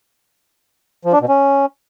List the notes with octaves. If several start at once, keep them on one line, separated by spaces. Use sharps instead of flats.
F3
D4
B2
C#4